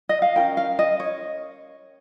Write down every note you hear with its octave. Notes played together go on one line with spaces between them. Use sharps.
D#5
F5
C#4 F4 A#4 G5
F5
D#5
C#5